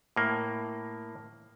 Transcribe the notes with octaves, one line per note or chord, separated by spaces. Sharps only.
A2 A#3